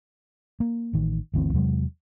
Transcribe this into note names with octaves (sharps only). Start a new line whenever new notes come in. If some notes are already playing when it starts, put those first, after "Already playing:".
A#3
A1 D#3
G1 D2 E3 C4
E2 C3 F#3 G#3